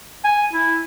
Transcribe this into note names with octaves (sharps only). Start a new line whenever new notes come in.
G#5
E4